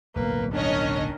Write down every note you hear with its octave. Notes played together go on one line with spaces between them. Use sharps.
D1 B1 E2 A#3 B4
D#3 C#4 D4 C#5 D#5